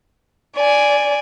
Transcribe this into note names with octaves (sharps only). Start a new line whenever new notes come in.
D5 G#5